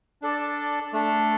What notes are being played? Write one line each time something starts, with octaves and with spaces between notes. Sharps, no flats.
D4 A4 D5
A3 D4 A4